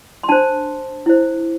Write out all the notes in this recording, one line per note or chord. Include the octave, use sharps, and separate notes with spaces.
C6
D4 C5 A5
E4 C5